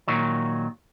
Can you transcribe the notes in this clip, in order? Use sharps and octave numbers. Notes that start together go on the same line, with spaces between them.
A#2 D#3 F#3